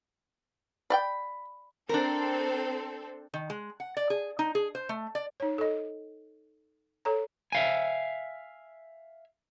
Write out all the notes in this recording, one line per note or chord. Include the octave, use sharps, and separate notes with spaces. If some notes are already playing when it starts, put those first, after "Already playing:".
D5 F#5 G5 B5
C4 D4 A4 A#4
D#3
G#3
F#5
D5
G#4
D#4
G#4
C5
A3
D5
D#4 C#5
A4 D#5
A4 C#5 A#5
E5 F5 G#5